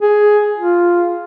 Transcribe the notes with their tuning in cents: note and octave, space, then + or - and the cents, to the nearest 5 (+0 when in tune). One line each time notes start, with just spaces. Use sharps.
G#4 +10
F4 +0